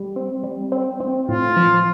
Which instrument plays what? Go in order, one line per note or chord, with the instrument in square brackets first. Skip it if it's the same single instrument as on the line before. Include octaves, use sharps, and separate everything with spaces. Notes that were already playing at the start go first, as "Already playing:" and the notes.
Already playing: [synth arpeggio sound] G3
C4
G3
C4
C4
[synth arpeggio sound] A2 [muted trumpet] F4
[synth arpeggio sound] F3